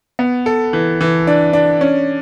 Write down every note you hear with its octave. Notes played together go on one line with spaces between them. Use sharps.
B3
A4
E3
E3
D4
D4
C#4